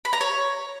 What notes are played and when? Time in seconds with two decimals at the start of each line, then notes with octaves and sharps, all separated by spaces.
0.05 B5
0.13 A#5
0.21 C#5